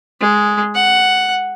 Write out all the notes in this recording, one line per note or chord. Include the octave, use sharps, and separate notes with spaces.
G#3
F#5